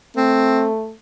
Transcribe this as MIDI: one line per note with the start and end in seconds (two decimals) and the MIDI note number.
0.17 0.93 57
0.17 0.68 60